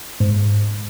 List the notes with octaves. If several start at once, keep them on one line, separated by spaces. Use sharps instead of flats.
G#2